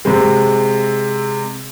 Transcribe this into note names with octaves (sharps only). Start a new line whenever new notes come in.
C3 G#3 C4